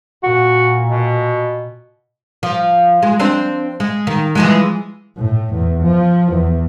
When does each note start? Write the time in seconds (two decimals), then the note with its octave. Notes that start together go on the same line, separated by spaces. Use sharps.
0.23 A#2 F#4
0.87 B2
2.43 F3
3.03 G#3
3.20 C4 D4 C5
3.80 G#3
4.07 D#3
4.35 E3 F3 G#3
5.17 A2
5.54 E2
5.83 F3
6.32 E2